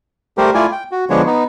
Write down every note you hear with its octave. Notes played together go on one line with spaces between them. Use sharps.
G3 A3 G4 A#4 C5
A3 E4 F4 D5 G#5
G5
F#4
D3 F3 G#3 B3 D4 C#5
B3 D#4